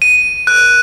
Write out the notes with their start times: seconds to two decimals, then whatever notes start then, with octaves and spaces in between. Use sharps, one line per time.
0.02 D#7
0.47 F#6